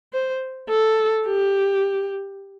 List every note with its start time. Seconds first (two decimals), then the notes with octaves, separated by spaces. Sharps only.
0.13 C5
0.70 A4
1.27 G4